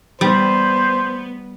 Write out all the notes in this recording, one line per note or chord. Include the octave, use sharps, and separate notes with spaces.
G3 B3 C5